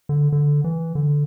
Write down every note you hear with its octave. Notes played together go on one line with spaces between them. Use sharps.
D3
D3
E3
D3